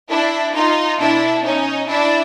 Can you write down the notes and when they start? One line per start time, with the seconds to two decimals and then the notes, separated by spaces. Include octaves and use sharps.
0.09 D4 E4
0.54 D#4 F4
0.99 B2 D4 E4
1.43 C#4 D#4
1.88 D4 E4